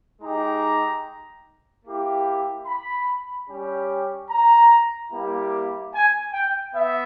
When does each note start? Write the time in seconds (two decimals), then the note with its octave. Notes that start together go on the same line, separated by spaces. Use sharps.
0.22 G#3 D#4 G4 A#5
1.84 A#3 E4 G4
2.66 B5
3.48 G3 C#4 G4
4.29 A#5
5.11 G3 A#3 E4 G4
5.93 G#5
6.32 G5
6.74 B3 E5